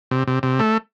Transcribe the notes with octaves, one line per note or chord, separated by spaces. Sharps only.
C3
C3
C3
A3